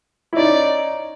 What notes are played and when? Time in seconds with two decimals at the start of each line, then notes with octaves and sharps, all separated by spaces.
0.33 E4
0.36 C#4 D#4 D5